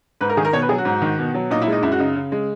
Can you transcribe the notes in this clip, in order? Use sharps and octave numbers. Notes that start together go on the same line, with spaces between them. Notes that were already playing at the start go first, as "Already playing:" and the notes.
G#2 B4
A#4
D#3 G#4
A#4
B2 C#5
B4
F#3 G#4
F#4
G#2
D#3
B2
F#3
A#2 D#4
E4
G#3 D#4
F#2 E4
F#4
C#3 D#4
C#3
G#3